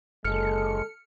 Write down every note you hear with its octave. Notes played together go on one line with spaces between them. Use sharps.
F#1 D#2 D3 G#3 A4 F6 C#7